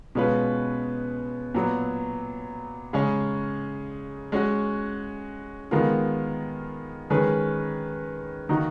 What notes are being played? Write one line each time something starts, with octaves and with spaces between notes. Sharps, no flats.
B2 G#3 C#4 F4 B4
A#2 F#3 B3
C#3 G#3 C#4
G#3 C#4 F#4
D#3 G#3 B3 F4 A#4
D#3 G#3 C#4 G#4 B4
D#3 A#3 D#4 F#4